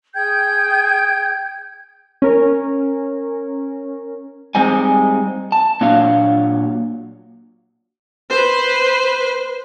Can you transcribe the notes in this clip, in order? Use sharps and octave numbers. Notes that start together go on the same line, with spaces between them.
G#4 G5 G6 G#6
C#4 A#4
G3 G#3 C4 D#4 G#5
A5
A#2 F#3 D4 F#4 F5
B4 C5